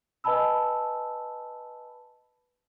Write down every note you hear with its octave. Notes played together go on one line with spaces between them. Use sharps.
B4 D#5 G#5 A5 B5 E6